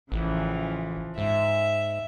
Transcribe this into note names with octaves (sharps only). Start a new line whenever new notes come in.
A1 C#3 E3 F3
G#2 E5